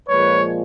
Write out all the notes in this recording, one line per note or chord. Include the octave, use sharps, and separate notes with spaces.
A#2 F3 G#3 B4 C#5